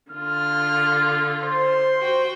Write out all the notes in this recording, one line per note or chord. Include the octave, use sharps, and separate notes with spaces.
D3 F4 F6
C5 C6
F#4 C5 G5